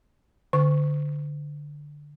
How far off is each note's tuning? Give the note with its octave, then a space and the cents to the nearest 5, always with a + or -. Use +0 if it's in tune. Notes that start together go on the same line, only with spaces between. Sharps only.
D3 +0 C#6 +0